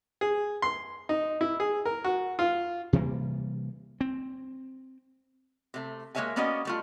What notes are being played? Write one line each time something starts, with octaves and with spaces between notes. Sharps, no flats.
G#4
C6
D#4
E4
G#4
A#4
F#4
F4
C3 E3 G3 A#3
C4
C3 A3
G#3 A#3 A#4 C#5 E5 G#5
A#3 B3 C#4 F#4 D5 D#5
G3 A3 F4